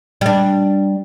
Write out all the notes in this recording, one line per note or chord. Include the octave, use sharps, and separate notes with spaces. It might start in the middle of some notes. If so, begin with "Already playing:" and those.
G3 D4